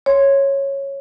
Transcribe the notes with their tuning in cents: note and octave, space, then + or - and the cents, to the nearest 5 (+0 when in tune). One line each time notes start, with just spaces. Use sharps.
C#5 -10 C6 +0